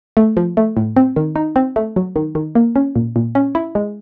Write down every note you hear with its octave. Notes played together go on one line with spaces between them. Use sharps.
A3
F3
A3
A2
C4
D#3
D#4
C4
A3
F#3
D#3
D#3
A#3
C#4
A#2
A#2
C#4
E4
G#3